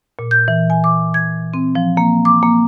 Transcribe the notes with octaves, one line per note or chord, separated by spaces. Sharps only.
A#2
G6
E3
G#5
D6
G#6
C4
F3
A#3
D6
A#3